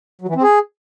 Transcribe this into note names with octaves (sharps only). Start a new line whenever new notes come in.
F#3
E3
C4
G#4